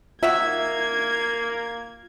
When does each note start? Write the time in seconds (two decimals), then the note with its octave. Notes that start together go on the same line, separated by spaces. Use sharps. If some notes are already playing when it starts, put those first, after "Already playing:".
0.23 D#3 A#3 F4 F#4 E5 G#6